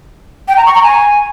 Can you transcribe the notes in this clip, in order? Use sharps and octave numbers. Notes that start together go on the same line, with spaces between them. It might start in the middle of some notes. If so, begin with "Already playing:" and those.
G5
A#5
C#6
A#5
G#5